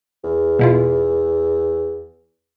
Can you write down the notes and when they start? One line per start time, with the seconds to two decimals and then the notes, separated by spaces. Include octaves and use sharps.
0.24 E2
0.59 B2 E4 F4